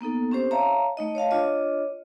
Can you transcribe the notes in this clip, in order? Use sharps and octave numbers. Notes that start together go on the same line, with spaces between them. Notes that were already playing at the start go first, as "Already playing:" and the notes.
A#3 B3 D#4 A4
C4 C#4 G4 C5
C#5 E5 F5 A5 A#5
A3 D#4 D#5
C#5 D#5 F5 A5
D4 F4 C#5 D#5